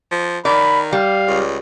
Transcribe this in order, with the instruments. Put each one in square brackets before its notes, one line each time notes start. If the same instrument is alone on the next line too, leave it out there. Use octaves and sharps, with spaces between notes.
[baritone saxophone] F3
[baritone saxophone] D#3 [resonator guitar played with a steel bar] D5 [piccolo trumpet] B5
[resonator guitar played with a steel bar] G3 [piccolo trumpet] F5
[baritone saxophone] C#2